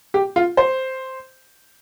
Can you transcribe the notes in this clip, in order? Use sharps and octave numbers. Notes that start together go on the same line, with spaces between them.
G4
F4
C5